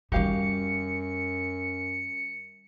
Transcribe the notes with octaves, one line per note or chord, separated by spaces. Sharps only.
F#2 D#3 G3 F#4 G4 F5 C#7